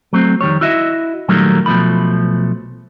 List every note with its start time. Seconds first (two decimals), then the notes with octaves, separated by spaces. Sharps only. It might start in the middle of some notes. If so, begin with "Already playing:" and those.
0.13 F#3 A3 C4
0.41 F2 D#3 G3 C#5
0.61 E4 F#4 D#5 E5
1.28 A#2 D#3 F#3 G3 A3 A#3
1.66 B1 B2 F3 A3 B5